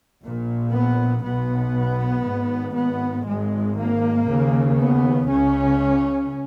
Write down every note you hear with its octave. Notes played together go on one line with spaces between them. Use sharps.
A#1 A#2
B3
B1 B2 B3
G#1 G#2
B3
G#1 G#2 G#3
A#3
D#2 C#3
B3
C#2 C#3 C#4